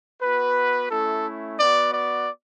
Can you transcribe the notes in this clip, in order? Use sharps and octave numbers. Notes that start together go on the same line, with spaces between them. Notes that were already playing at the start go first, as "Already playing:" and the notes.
B3 F#4 B4
A3 C#4 E4 A4
B3 F#4 D5
D5